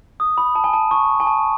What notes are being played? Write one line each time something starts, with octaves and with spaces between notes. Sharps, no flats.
D#6
B5
A5
G#5
A5
C#6
G#5
A5